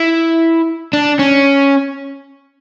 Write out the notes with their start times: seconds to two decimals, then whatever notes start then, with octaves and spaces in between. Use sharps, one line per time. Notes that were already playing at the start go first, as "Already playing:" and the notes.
Already playing: E4
0.93 D4
1.19 C#4